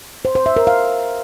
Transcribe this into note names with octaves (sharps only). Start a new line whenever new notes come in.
C5
C5
E5
A#4
F5